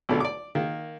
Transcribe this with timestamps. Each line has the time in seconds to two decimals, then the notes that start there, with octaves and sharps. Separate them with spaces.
0.09 B1 B2 D3
0.20 D5 D6
0.55 D#3 A#3